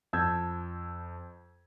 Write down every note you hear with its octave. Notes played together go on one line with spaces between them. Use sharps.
F2 A5 E6 G6 G#6